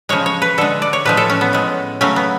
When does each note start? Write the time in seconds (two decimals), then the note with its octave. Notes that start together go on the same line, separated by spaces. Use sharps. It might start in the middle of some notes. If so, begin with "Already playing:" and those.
0.09 C#3 F3 G#3 C#5
0.26 C#5
0.42 B4
0.58 D3 G#3 A4
0.82 D5
0.93 C#5
1.05 A2 F3 G#3 B4
1.17 A4
1.30 C#4
1.41 B3
1.53 A2 G#3
2.01 C#3 F#3 A3 C#4
2.16 B3